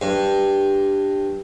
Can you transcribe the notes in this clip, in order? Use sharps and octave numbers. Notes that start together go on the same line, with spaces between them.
G2